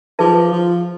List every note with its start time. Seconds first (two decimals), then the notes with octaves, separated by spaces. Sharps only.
0.19 F3 D#4 G#4 B4 E5 A5
0.52 F3